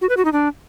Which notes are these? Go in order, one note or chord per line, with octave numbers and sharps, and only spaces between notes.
F#4
B4
F#4
D#4
D4